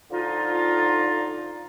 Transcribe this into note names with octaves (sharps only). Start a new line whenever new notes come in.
D3 F3 D#4 F4